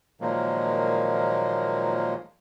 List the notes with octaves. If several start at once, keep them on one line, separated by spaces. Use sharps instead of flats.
A#2 D#3 F3 F#3 G#3 A#3